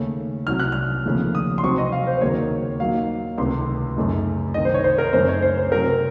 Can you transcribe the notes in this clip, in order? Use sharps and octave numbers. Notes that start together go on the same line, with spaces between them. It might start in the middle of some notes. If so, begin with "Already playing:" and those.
Already playing: D#2 C#3 A3 C#4
C2 C3 F#3 F6
F#6
F6
D#2 C#3 F3 A3
D#6
C6
C3 F#3 C4 C#6
D#5
F5
C5
C5
D#2 C#3 F#3 A#3 C#5
A#2 F#3 A#3 D#4 F5
C#2 C3 D#3 A3 C6
F#2 C#3 A3 D#4
C2 C3 D#3 D#5
C5
C#5
C5
A#4
F#2 C#3 A3 D#4 C5
C#5
C5
C5
C3 F#3 C4 A#4